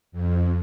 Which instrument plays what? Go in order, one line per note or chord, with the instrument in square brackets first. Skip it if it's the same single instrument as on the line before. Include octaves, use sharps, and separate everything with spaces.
[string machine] F2